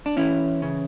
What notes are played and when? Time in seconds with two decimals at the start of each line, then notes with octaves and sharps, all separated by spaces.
0.06 D4
0.17 E3 C#4 E4
0.62 C#3